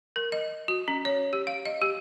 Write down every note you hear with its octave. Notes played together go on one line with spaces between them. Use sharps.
A#4
D#5
F#4
C#4
C#5
G4
F5
D#5
G4